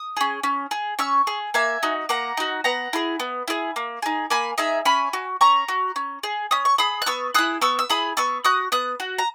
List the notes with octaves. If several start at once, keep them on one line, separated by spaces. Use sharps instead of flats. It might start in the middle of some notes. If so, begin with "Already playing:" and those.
Already playing: D#6
C#4 G#4
C#4
G#4
C#4 C#6 E6
G#4
A#3 E5 G#5
D#4 F#4
A#3 F#5 A#5
D#4 F#4
B3 F#5 A#5
E4 G#4
B3
E4 G#4
A#3
D#4 G#4
A#3 G#5 B5
D#4 G#4 E5 G#5
C#4 G#5 B5
F#4
C#4 A#5 C#6
F#4
C#4
G#4
C#4 D#6
C#6
G#4 B5 D#6
F#6
B3 C#6 E6
E4 G#4 D#6 F#6
B3 C#6 E6
E6
E4 G#4 B5 D#6
B3 C#6 E6
F#4 D#6 F#6
B3 D#6 F#6
F#4
A#5